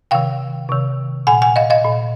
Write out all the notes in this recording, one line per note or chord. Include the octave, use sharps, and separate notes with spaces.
C3 D#3 F5 G5
C3 D#3
A#2 F#5 G#5
F#5 G#5
D#5 F5
D#5 F5
A#2